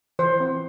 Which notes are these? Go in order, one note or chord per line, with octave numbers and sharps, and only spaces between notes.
E3 C5
C4